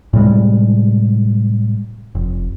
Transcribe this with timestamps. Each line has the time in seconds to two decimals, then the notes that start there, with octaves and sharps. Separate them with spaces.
0.13 A2 C3 G3 G#3
2.15 F1